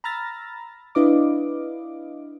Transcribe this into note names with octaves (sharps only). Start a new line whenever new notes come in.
A#5 B5 E6 F6 A6 A#6
D4 E4 B4 D#5 F5 D6